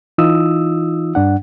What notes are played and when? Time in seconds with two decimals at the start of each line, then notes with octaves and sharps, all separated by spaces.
0.18 E3 D#4 F4 D#6 E6
1.15 G2 D4 F#5